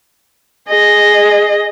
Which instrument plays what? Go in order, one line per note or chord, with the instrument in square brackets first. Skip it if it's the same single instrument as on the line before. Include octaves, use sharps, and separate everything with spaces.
[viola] G#4 D#5